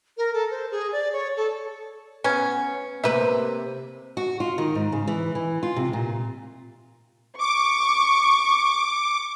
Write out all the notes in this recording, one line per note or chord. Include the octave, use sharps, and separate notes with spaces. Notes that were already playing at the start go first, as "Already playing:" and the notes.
A#4
A4
C5
G#4
D5
C#5
A4
B3 C#4
C3 A#3 B4 E5
F#4
F4
D#3
G#2
C#3
E3
E3
F4
C3
A#2
C#6 D6